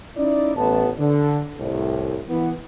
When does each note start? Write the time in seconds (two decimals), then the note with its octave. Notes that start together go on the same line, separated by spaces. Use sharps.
0.17 C#4 D#4 E4 D5
0.56 A1 B3 A5
0.98 D3
1.59 C2 A2
2.28 E3 B3